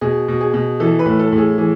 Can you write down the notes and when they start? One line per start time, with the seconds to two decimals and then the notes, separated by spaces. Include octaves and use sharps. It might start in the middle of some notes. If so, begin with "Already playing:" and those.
0.01 B2 G#4
0.28 B2
0.41 G#4
0.54 B2
0.80 E3 A4
0.99 B4
1.06 A2
1.19 A4
1.32 A2
1.38 G#4
1.58 E3 G#4